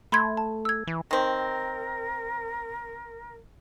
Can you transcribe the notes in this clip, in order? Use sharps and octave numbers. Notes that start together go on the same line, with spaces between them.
A3 B5 C6 G#6
A5
E6 G#6
E3
D#3 C4 A#4